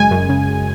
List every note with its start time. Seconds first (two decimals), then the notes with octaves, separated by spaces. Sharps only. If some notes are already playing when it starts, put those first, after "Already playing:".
Already playing: F#2 C#3 G#3 G#5
0.11 F#2
0.29 C#3